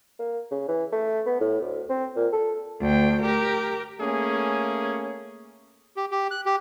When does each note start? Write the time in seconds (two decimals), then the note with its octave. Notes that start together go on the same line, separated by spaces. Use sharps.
0.19 A#3
0.51 C#3
0.68 E3
0.92 A3
1.26 B3
1.40 A2
1.61 D2
1.89 C4
2.16 A#2
2.33 A4
2.81 D2 G5
3.23 G4 A#4
4.01 A3 A#3 C#4 G#4
5.97 G4
6.11 G4
6.31 F#6
6.46 G4